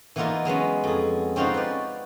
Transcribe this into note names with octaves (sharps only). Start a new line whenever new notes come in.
E3 A#3 B3 D#4 F4 A#4
F#3 G#3 B3 C#4
F2 G#4
C4 C#4 D#4 F4 F#4 C5
B4 D5